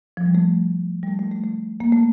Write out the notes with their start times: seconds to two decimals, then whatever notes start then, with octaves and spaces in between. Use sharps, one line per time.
0.17 F3
0.26 G3
0.35 A3
1.03 G3
1.08 A3
1.19 A3
1.32 A3
1.44 A3
1.80 A#3
1.92 A3